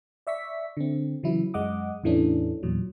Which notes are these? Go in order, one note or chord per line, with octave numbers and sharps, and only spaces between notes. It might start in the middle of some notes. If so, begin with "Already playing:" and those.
D5 E5 C#6 B6
D3 C4
C#3 E3 F#3 E4
F#2 G#3 D#5 F#5 D6 D#6
E2 A2 E3 A3 C#4 D4
E2 A#2 F#3